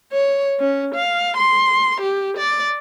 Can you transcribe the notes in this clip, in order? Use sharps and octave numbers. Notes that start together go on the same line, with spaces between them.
C#5
C#4
F5
C6
G4
D5